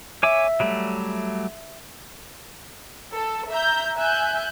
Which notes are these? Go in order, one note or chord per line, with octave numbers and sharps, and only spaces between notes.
C#5 E5 G#5 D6
F#3 G3 A3
A4
E5 A#5 G6
E5 G#5 F#6 G6